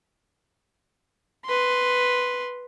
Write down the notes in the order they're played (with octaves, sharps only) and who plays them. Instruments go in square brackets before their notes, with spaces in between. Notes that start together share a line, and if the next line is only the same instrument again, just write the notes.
[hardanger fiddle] B4 C6